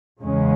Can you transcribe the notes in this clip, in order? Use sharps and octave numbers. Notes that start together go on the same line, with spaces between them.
E2 C#3 G#3 C#4